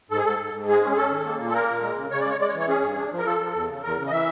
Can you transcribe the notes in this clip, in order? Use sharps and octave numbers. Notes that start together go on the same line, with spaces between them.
G#2 A4
G#4
G#2 A4
G#2
G#2
G#3 G#4
C#4
G#4
C#4 A4
D#3
A#3
A#2
A4
A#3 A#4
A#2
G#3
C#3
C#3 C#5
D5
G#3 C#5
G#3 D5
C#5
E3
C#5
C#4 G#4
G2
D4
F3
A#4
F3 A4
F3
E2
C#3
E2 A#4
C#3
D#5
E3 E5